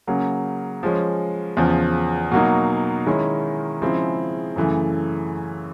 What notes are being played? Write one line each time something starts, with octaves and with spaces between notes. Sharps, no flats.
C#3 F#3 A#3
F3 G#3 C#4
E2 C#3 F3
B2 F#3 A#3 D#4
D#3 G#3 C#4 E4
C#3 F3 G#3 C4 E4
F#2 C#3 E3 A3